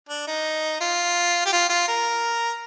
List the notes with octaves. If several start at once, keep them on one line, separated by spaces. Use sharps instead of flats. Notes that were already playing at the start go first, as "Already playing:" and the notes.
D4
D#4
F4
G4
F4
F4
A#4